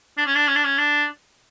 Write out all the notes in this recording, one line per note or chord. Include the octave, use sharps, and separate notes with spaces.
D4
C#4
D4
C#4
D4
C#4
D4